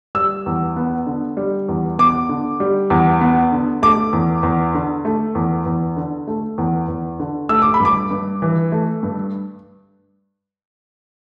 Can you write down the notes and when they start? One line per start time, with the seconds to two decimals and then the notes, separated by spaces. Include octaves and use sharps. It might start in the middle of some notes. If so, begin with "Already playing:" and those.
0.15 G3 E6
0.46 E2
0.76 B3
1.06 D3
1.37 G3
1.69 E2
1.99 B3 D6
2.29 D3
2.60 G3
2.90 E2
3.21 B3
3.52 D3
3.82 A3 D6
4.13 E2
4.43 E2
4.74 D3
5.05 A3
5.35 E2
5.66 E2
5.96 D3
6.27 A3
6.58 E2
6.88 E2
7.20 D3
7.49 A3 E6
7.62 D6
7.74 B5
7.80 G2 D6
8.11 G2
8.42 E3
8.72 A3
9.03 G2